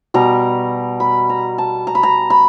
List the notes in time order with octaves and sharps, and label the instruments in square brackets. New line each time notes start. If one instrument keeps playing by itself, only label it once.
[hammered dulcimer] B2 G3 A#5
B5
A#5
A5
A#5
B5
A#5
B5